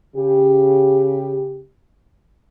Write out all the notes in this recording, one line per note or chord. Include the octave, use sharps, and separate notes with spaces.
C#3 G4